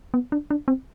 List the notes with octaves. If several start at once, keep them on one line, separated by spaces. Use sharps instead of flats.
B3
D4
D4
C4